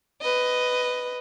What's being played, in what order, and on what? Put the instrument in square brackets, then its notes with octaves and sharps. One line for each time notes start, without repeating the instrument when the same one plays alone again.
[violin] B4 D#5